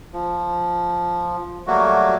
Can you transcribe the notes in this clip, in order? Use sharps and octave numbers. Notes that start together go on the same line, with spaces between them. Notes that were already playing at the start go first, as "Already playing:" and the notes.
F3
F#3 G3 A3 A#3 F#4